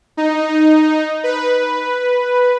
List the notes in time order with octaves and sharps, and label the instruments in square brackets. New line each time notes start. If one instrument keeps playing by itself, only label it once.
[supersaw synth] D#4
B4